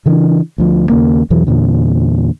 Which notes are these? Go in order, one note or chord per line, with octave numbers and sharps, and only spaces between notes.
C#3 E3 D4
D2 F3
D#2 C#3 A#3
E2 B2 E3 F#3
E2 A#2 D3